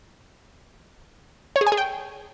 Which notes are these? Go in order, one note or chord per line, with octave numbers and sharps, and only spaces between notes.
C#5
G#4
G#5
G#4
G5